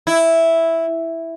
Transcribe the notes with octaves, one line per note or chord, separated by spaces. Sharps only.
E4